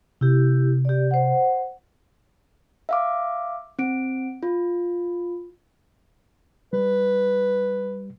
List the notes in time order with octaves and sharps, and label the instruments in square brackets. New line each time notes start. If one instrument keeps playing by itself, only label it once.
[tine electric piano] C3 [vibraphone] E4 G4
[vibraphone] G4 D5
C5 F#5
[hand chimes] E5 F5 D6
C4 D7
F4
[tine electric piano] G3 [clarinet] B4